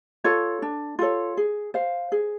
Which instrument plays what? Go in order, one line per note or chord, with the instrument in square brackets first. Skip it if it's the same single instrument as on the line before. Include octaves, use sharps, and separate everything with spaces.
[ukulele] F4 A4 C#5
D4
F4 A4 C#5
G#4
C5 F5
G#4